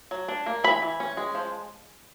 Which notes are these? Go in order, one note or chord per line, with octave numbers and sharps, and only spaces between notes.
F#3
D4
A#3
E3 B5
E3
C#4
G#3
F3